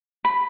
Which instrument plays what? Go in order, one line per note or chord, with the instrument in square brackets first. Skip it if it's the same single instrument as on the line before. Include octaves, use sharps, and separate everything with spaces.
[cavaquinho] B5